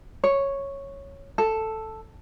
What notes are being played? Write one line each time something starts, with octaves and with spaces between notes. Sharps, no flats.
C#5
A4